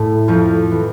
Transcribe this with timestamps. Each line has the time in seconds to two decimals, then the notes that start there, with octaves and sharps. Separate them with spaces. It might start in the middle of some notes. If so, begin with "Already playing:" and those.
Already playing: A2 A3
0.28 F2 F3
0.71 E3